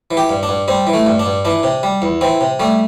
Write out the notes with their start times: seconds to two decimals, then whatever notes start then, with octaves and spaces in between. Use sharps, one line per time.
0.11 E3
0.17 G4
0.29 G2
0.43 D4
0.49 G2
0.68 G3 C4
0.87 E3
0.93 A3
1.06 G2
1.19 D4
1.26 G2
1.45 E3 D4
1.63 C3
1.83 G3
2.02 E2
2.21 E3 C4
2.41 C3
2.60 G3 A3